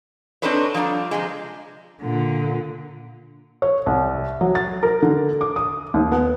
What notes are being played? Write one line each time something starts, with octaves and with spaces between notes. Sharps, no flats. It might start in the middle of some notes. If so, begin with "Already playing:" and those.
C4 D4 D#4 A4 B4 C#5
F3 G3 D4 A#5
C3 F3 G#3
A#2 D3
C#5
C2
F#3
A6
A#4
D3
D6
D#6
D#2
B3